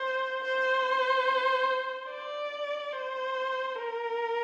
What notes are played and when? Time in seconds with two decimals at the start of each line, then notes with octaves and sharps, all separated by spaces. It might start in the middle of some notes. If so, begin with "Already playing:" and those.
Already playing: C5
0.44 C5
2.10 D5
2.93 C5
3.75 A#4